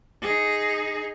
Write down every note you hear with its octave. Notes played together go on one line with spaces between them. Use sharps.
D#4 G#4